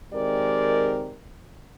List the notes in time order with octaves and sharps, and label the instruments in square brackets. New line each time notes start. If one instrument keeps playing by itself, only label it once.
[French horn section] D#3 G#3 C4 G4 A#4 D5